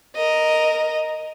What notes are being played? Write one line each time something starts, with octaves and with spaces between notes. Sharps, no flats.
A#4 D#5